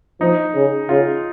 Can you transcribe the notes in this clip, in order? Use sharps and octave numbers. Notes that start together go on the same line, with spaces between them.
F3 D#4
C#3
C#3 F4